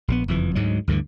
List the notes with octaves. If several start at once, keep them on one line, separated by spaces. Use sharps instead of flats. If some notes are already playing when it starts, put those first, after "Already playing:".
A#1 D3 B3
F#1 F2 E3
D2 G#2 F#3 G#3
D2 G2 D3 E3